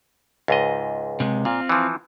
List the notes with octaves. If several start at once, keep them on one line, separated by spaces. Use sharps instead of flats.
C#2 G#2 D#5
C3 G#3
A#2 C4 F4
E3 F3